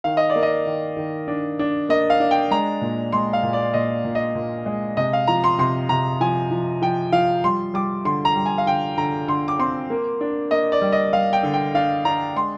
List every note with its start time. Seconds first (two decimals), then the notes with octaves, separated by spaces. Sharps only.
0.04 D#3 F5
0.17 D#5
0.30 D5
0.36 A#3
0.43 D#5
0.66 D#3
0.97 D#3
1.28 D4
1.59 D4
1.89 A#3 D#5
2.10 F5
2.20 D4
2.31 G5
2.51 G#3 A#5
2.81 A#2
3.12 G#3 C6
3.33 F5
3.43 A#2
3.53 D5
3.74 A#2 D#5
4.05 A#2
4.15 D#5
4.35 A#2
4.66 G#3
4.97 C3 D#5
5.13 F5
5.27 F3 A#5
5.44 C6
5.59 C3 C6
5.89 C3 A#5
6.20 F3 G#5
6.51 F3
6.82 F3 G5
7.12 F3 F5
7.44 G3 C6
7.74 G3 D6
8.05 D3 C6
8.25 A#5
8.36 G3
8.46 G#5
8.58 F5
8.66 D3 G5
8.98 D3 A#5
9.28 D3 C6
9.48 D6
9.59 C4 C6
9.90 A#3
10.21 D4
10.51 A#3 D#5
10.72 D5
10.81 G3
10.92 D#5
11.13 G3 F5
11.33 G5
11.43 D3
11.54 G5
11.74 D4 F5
12.05 D4 A#5
12.36 G#3 C6